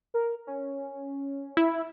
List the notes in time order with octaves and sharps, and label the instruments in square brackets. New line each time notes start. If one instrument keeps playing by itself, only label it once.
[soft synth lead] A#4
C#4
[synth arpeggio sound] E4